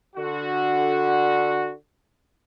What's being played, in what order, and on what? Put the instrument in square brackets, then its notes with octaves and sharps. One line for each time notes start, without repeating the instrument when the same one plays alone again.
[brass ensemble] D3 F#4